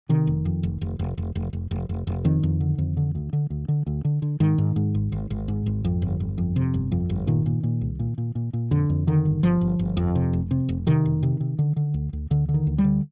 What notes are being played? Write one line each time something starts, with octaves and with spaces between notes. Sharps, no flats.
C3 D#3
F1
F2
F1
F1
F1
F1
F1
F1
F1
F1
F1
F2 D#3
F2
D3
F2
D3
D2
D3
D2
D3
D2
D3
D3
G#2 D#3
G#2
G#2
G#1
G#1
G#1
G#2
G#1
F2
G1
G1
F2
C3
G1
F2
G1
A#2 D#3
A#2
A#2
C2
A#2
A#2
A#2
A#2
F2 D3
F2
D3 D#3
G1
G1 F3
G1
G1
F2
C3
F1
C3
F1
C3 D#3
F1
C3
C3
D3
D3
D2
D2
D2 D3
D3
D#3
D2
G3
D3